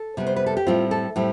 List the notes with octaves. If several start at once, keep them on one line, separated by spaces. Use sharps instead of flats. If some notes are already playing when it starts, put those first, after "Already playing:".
Already playing: A4
C3 G3 B3
C5
B4
A4
G4
A2 G3 C4 F4
A4
A2 G3 C4